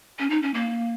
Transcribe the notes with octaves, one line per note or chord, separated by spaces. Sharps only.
C#4
D#4
C#4
A#3